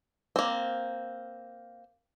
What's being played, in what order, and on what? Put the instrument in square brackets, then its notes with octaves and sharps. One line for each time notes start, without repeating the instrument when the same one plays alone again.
[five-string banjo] A#3 C4